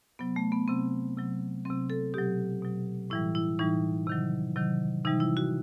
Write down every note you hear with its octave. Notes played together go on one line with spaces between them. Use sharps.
C3 F#3 B3
A3
B3
C3 F#3 C4
C3 F#3
C3 F#3 C4
A4
B2 F#3 G4
B2 F#3
A2 E3 G3 E4
E4
A2 E3 G3 D#4
C3 D#3 F#3
C3 D#3 F#3
C3 E3 G3 D#4
E4
F#4